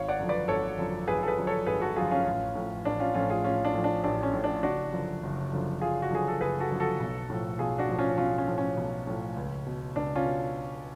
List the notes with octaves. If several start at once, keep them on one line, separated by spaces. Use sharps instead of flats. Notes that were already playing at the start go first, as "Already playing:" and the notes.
Already playing: G#1 C#5 F5
D5 F#5
F#2 D3 F3
B4 D5
G#1 A4 C#5
F#2 D3 F3
G#1 G#4 B4
A4
G#4 B4
F#2 D3 F3
A4 C#5
G#1 G#4 B4
F#4 A4
F#2 D3 F3 F4 G#4
C#4 F4
A1
A2 F3
A1 D4
C#4 F4
A2 F3 C#4 F4
F4 G#4
A1 C#4 F4
D4
A2 F3
D4
A1 D4
C#4
A2 F3
D4
F#1 D4 F#4
F#2 D3 F3
F#1
F#2 D3 F3
F#1 F4 G#4
F#4
F#2 D3 F3 G#4
A4
F#1 G#4 B4
F#4 A4
F#2 D3 F3
F#4 A4
B1
A2 F3
B1 F4 G#4
D4 F#4
A2 F3
C#4 F4
B1 C#4 F4
C#4
A2 F3
C#4
B1
A2 F3
C#2
B2
C#2 D4
C#4 F4
B2